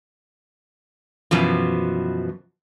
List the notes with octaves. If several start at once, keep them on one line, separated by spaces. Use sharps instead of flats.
F#2 B2 E3 F3